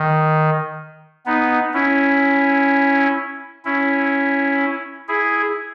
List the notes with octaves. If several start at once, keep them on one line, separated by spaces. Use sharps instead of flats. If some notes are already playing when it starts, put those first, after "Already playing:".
Already playing: D#3
B3 D#4
C#4 E4
C#4 E4
E4 G#4